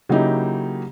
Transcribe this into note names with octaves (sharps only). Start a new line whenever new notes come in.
C#3 F#3 A#3 D#4 E4 G4